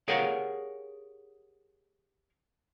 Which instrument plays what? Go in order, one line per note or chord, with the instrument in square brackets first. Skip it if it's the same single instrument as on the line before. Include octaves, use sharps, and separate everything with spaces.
[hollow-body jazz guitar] G4 G#4 A#4 C#5 F5 F#5